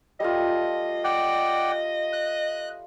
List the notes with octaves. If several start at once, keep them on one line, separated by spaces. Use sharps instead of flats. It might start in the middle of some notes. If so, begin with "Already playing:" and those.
G3 A3 F4 D#5
D5 F#5 G5
F#6